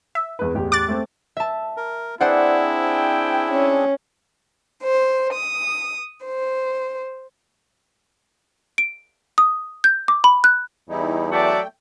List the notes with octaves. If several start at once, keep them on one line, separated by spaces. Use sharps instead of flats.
E5
E2 B4
A1 E2 G4
D6 F#6 A6
A3 C4
E5 A5
A#4
C4 D4 E4 G#4 C5 D5 F#5
G5
C#4
C5
D#6
C5
D7
D#6
G6
D6
B5
F#6
E2 G3 D#4 E4
F#3 A3 F#4 D5 E5 G5 A5